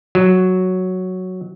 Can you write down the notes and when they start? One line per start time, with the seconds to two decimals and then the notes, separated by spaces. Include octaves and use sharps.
0.15 F#3